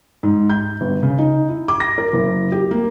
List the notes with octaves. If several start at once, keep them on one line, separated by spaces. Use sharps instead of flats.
G#2
G6
G1
C#3
D#4
E4
D6
A#6
A#4
F#1
G4
A#3